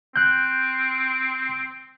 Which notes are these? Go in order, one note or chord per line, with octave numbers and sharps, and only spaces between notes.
C4 F#6 G6